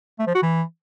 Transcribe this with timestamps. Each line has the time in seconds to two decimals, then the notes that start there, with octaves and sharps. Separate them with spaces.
0.19 A3
0.27 F3
0.35 F#4
0.43 E3